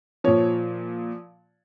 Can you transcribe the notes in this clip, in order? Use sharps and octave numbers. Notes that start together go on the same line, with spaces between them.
A#2 F3 C#5